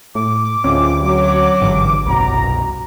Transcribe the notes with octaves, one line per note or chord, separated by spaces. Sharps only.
A2 D6
D2 G#3 C4 C#4 F4
F#3
G#1 G2 D3 E3
C2 F#2 B2 A#5